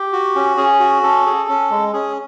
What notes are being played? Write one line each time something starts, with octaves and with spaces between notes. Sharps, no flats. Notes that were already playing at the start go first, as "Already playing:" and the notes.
Already playing: G4
F#4
C#4
C#4 G#4
F#4
C#4 A4
G#4
C#4
G#3
C#4 G#4